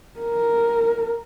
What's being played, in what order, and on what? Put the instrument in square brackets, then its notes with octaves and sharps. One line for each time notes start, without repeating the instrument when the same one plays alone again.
[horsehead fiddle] A#4